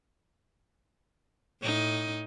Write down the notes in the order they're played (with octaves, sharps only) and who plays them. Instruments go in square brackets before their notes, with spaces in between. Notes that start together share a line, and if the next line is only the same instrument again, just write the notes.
[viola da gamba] A2 D#4